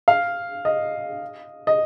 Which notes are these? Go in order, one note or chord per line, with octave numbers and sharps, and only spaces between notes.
F5
D#5
D#5